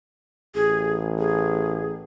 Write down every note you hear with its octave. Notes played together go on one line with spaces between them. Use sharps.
A1 G#4
G#4